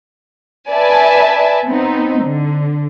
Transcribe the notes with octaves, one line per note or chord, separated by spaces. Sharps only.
B4 D5 E5 G#5 A5
B3 C4 D#4
D3